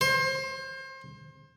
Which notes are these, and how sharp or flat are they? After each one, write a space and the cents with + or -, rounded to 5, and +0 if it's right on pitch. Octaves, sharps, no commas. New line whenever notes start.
C5 +30